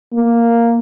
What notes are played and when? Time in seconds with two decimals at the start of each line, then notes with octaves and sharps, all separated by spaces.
0.13 A#3